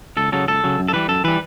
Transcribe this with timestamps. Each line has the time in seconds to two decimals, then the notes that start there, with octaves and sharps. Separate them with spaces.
0.17 C#2 A4
0.32 C#3 F#3 A4
0.47 C#2 A4
0.64 C#3 F#3
0.79 F#2
0.88 A4
0.93 E3 G3 B4
1.08 F#2 A4
1.24 E3 G3 B4